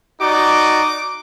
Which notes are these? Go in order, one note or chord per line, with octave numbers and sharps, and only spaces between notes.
D#4 F#4 D5 D6